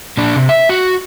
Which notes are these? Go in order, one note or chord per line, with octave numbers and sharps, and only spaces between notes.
A#2 D4
C3
E5
F#4